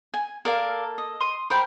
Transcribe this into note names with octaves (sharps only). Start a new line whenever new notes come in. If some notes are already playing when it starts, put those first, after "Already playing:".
G#5
A#3 A4 A#4 D5 F5
D#5
C6 D#6
A#4 C5 G5 B5